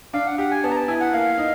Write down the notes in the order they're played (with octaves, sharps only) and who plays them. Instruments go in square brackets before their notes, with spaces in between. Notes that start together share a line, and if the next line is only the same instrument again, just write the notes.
[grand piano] D4 [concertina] F5
[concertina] F#5
[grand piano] G4 [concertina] F#5
[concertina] G#5
[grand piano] B3 [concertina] A5
[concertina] A#5
A5
[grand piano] E4 [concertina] G#5
[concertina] F#5
[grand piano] A#3 [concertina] F5
[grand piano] D#4